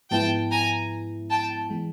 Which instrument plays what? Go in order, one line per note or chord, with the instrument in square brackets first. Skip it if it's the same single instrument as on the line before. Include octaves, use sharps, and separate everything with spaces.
[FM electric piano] G#2 F3 G#3 B3 E4 [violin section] G5 A5
[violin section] G#5 A#5
G5 A5
[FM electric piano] E3 G#3